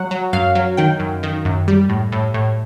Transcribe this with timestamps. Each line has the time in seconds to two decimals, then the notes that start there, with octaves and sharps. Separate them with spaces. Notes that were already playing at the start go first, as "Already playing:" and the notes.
Already playing: F#3 F#5
0.11 F#3
0.33 F#2 F5
0.55 F#3
0.77 D#3 G5
0.99 F#2
1.23 D#3
1.45 F#2
1.68 G3
1.89 A2
2.12 A2
2.34 A2